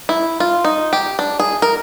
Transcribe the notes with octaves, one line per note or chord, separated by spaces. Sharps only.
E4
F4
D#4
G4
D4
G#4
A#4